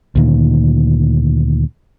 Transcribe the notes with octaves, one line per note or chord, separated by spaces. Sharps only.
D2 A#2 D#3